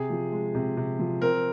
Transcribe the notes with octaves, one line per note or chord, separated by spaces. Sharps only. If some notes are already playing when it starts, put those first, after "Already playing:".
Already playing: C3 G#4
F3
G#3
C3
C3
F3
C4 A#4